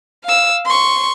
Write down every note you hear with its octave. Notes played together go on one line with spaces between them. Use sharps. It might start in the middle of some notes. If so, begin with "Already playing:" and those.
F5 E6
C6 C#6